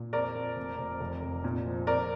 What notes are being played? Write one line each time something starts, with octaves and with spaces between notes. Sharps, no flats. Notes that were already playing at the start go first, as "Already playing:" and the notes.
Already playing: A#2
F2 A#4 D5
F2
F1
F1
F1
F1
A#2
F3
F2 A#4 D5